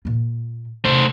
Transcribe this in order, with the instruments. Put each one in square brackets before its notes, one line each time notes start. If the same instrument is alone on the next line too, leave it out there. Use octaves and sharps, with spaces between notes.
[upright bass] A#2 F4
[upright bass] C3 [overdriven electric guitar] A3 C5